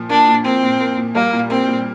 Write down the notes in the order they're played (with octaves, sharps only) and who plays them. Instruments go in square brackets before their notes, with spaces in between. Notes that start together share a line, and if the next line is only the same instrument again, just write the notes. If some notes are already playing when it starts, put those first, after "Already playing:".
Already playing: [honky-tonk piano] A#2 F3
[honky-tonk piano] A#3 [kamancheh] D4
[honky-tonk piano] A#2
[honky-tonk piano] A#3 [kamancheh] C4
[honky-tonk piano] A#2
A#3
A#2
[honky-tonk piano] G3 [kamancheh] A#3
[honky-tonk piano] A#2
[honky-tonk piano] A#3 [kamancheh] C4
[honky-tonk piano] A#2